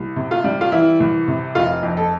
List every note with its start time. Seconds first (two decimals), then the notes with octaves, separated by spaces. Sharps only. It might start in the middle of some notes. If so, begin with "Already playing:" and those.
Already playing: C2
0.16 C3
0.31 F4
0.44 G3
0.61 F4
0.72 E3 E4
1.00 C2
1.28 C3
1.55 F1 F4
1.83 F2
1.97 A4